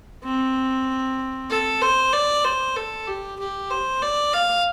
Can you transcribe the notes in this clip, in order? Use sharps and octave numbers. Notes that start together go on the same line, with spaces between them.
C4
A4
C5
D5
C5
A4
G4
G4
C5
D5
F5